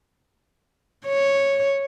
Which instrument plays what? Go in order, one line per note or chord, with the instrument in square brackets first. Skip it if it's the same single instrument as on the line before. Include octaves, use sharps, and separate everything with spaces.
[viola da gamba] C#5